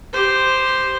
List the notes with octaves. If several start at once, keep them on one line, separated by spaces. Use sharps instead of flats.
G4 C5